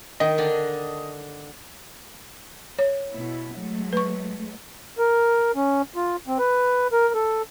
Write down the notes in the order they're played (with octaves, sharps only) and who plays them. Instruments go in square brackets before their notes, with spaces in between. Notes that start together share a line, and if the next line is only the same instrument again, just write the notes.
[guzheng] D#3 [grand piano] D#5
[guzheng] D3 D4
[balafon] C#5
[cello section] B2 E4
F#3 G#3 A3
[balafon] B4 C#6
[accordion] A#4
C#4
F4
C4
B4
A#4
A4